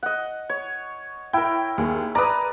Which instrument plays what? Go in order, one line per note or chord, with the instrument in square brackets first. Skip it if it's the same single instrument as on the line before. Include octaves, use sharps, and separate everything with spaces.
[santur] D#5 F#5
C#5
[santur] E4 A#4 [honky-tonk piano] G5
[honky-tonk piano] D#2 [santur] G#4
[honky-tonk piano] B4 A#5 [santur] D5 D#6